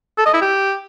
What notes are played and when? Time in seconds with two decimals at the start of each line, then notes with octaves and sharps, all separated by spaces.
0.18 A4
0.26 D#5
0.34 E4
0.42 G4